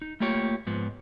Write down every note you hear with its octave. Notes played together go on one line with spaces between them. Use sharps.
D#4
A3 A#3 F4 G4 C#5
G#2 F3 B3